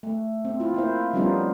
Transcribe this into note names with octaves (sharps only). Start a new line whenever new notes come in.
A3
C4
E4 F4
A#3 E4 C5
F3 G3 B3 C#4 D#4 F4